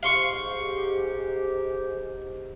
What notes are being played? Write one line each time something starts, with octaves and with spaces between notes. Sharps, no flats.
G#2 G4 F5 C6 C#6